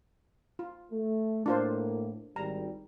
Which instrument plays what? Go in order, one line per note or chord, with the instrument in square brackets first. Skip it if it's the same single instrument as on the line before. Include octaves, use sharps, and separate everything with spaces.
[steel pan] F4
[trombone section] A3
[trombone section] A2 A#3 [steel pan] D4 F4 C5
[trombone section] G#1 G3 [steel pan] A#5